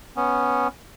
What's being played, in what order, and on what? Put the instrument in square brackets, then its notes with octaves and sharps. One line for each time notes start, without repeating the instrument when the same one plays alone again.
[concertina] B3 C#4